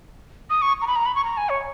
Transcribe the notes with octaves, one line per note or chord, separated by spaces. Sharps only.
D#6
C#6
A#5
B5
A#5
B5
C#6
A#5
G#5
C#5